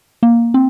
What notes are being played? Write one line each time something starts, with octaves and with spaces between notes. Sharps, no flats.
A#3
C4